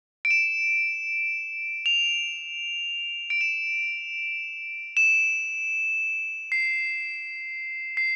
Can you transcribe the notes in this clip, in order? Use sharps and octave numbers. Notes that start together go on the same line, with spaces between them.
D7
E7
F7
D7
E7
E7
C7
C7